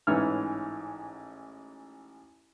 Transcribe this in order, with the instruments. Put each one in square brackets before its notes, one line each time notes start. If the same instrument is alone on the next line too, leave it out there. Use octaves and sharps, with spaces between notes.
[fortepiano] A1 G#2 E3 C#5 F6